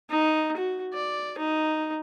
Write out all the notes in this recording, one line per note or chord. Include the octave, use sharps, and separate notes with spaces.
D#4
F#4
D5
D#4